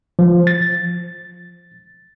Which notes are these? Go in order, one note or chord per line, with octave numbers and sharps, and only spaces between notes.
F3
A6